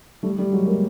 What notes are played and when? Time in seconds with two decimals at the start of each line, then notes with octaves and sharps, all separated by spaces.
0.23 G3 A3
0.37 G3 A3
0.52 F#3 G#3
0.66 G#3 A#3